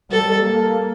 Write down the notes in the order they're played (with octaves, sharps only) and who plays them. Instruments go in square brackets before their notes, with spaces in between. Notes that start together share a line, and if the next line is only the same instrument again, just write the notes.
[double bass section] G3 [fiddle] A4
[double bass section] A#3